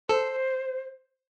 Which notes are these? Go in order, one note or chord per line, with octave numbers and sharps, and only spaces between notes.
A4 C5